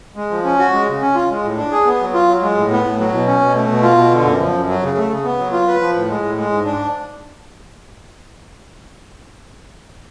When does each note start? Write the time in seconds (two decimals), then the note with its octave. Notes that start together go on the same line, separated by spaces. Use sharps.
0.16 G#3
0.30 F3
0.44 C#4
0.59 F#4
0.73 G#3
0.87 C#3
1.01 C#4
1.15 F4
1.29 G#3
1.43 A2
1.57 D4
1.72 G#4
1.86 B3
2.01 F#3
2.14 F4
2.28 F#3
2.42 G#3
2.57 A2
2.71 B3
2.85 A2
2.99 F#3
3.13 B2
3.27 C#4
3.41 B2
3.55 A3
3.69 B2
3.83 F4
3.97 B2
4.12 D3
4.25 F#2
4.39 F3
4.54 F#2
4.68 F#3
4.83 C#3
4.97 A3
5.10 C#3
5.25 B3
5.39 F#3
5.52 F4
5.67 B4
5.81 F3
5.95 A2
6.10 G#3
6.23 A2
6.37 G#3
6.52 G#2
6.65 D4